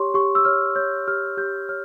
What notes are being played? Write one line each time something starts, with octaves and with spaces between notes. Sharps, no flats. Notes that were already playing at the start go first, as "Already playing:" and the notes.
Already playing: G4 C#5 C6 C#6
G4 C#6
E6
C#5 F6
C#5 G6
G4 F6
G4 G6
C#5 F6